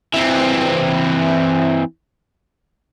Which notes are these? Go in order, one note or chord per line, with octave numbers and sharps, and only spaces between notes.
E3 C4